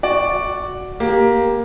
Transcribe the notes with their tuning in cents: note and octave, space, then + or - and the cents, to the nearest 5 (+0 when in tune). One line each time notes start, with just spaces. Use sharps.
F#4 +0 D5 +0
A#3 +10 G4 +0